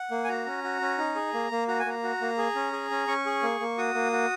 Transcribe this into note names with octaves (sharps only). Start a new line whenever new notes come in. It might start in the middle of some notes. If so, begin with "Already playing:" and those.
Already playing: F#5
A#3
G#5
F#4 A#5
C#4
F#4
C#4
D#4
G#4
A#3
A#3
F#4 A#5
G#5
A#3 A#5
F#4
A#3
G#4
C#4
G#4
C#4
C#4 C#6
G#4
A#3
A#3
F#4 D#6
A#3
F#4